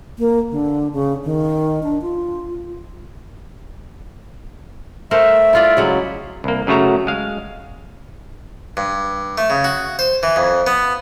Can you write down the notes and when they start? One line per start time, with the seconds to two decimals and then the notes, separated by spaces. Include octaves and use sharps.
0.19 A#3
0.51 D3
0.93 C#3
1.24 D#3
1.83 D4
2.02 F4
5.11 A3 A#4 C5 E5
5.53 E4 F4 D5
5.77 C#3 F#3 G#3
6.44 C2 A#3
6.67 F#2 C#3 A3 F#4 A#5
7.07 G#3 F5
8.77 G2
9.38 A3
9.50 C#3
9.64 F#4
9.99 C5
10.23 E3
10.36 F2
10.67 B3